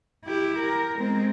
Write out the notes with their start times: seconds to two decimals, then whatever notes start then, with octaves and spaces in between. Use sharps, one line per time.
0.25 E4 G4
0.60 A#4
0.99 G#3 C4